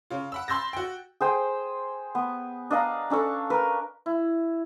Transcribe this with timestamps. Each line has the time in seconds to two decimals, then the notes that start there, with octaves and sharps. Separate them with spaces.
0.10 C#3 F4
0.32 F#5 B5 E6
0.48 B5 C6 E6 G6 A6 A#6
0.73 F#4 G5
1.21 G#4 C5 G5
2.15 B3
2.70 D4 D#5 F5 A#5
3.10 C#4 D4 A4 C#6
3.50 A#4 B4
4.06 E4